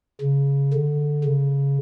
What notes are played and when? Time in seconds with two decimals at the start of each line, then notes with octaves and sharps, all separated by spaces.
0.21 C#3
0.73 D3
1.24 C#3